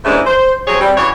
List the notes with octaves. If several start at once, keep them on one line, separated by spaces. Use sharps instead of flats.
D#2 G#2 E3 A3 C#4 D4
C5
F3 F#3 C4 G#4 C#5
G3 C4
C#3 E3 F#4 C#5